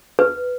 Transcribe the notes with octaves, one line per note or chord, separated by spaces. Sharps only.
B4